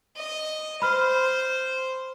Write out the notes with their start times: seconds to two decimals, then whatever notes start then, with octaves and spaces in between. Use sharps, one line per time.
0.17 D#5
0.82 C5 B5 F6